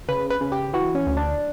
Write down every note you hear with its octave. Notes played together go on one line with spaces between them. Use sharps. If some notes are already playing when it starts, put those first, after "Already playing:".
C#3 B4
B4
C#3
G4
E3 F#4
C#4
D2
D4